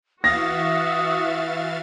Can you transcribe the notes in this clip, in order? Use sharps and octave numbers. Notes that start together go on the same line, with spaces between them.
E3 F#4 E5 F5 D#6 A6 A#6